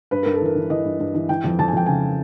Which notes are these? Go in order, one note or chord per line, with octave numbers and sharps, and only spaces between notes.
G2 B4
G2 A#4
A4
E3 A#4
E3
E3 D#5
G2
G2
E3
E3 G5
F2
F2 A5
G#5
F2 G5
C#3 G#5